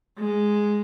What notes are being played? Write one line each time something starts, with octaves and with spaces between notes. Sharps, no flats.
G#3